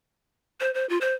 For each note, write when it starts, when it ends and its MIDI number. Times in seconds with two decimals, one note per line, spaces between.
0.60 0.73 72
0.74 0.88 72
0.89 0.98 65
1.01 1.15 72